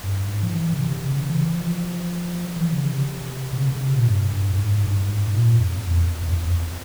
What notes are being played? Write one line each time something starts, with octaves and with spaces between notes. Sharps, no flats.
G2
G#2
F3
E3
C#3
C3
C#3
E3
F3
E3
C#3
C3
C3
C#3
C#3
C3
A#2
G2
G2
G2
G#2
G2
G#2
G#2
A#2
F2
E2
E2
F2
E2
F2